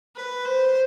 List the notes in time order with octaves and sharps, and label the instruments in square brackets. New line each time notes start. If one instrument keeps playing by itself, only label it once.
[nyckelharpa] B4
C5